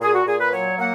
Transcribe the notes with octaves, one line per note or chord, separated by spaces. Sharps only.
A#2 G#4
F#4
A#2 G#4
B4
F#3 C#5
A#3 F#5